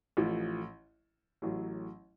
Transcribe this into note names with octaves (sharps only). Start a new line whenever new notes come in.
A1 A2 F3
A1 A2 F#3